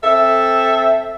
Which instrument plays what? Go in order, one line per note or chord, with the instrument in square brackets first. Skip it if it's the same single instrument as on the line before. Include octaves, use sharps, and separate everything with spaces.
[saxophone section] C4 A4 E5